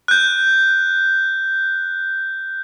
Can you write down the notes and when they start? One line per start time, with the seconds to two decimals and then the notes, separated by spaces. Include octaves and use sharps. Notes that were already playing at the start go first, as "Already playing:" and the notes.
0.08 F#6 G6